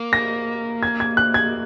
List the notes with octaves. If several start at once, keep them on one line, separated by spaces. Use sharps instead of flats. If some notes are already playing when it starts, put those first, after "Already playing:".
Already playing: A#3
A#6
G#6
G#6
F#6
G#6